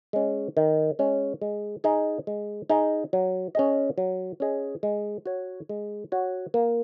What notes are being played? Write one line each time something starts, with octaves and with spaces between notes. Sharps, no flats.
G#3 C#4
D#3
G#3 C#4
G#3
D#4 G#4 D#5
G#3
D#4 G#4 D#5
F#3
C#4 G#4 D#5
F#3
C#4 G#4 D#5
G#3
F#4 C#5
G#3
F#4 C#5
A#3